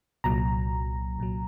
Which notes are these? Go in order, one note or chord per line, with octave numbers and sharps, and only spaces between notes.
C2 A#2 F#3 A#5
C2 A#2 F#3